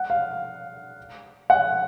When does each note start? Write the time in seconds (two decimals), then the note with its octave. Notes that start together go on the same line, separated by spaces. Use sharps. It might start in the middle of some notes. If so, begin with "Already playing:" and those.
Already playing: F#5
0.10 F5
1.50 F#5